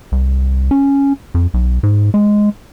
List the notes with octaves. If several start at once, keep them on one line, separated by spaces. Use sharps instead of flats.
C2
C#4
F2
B1
G#2
G#3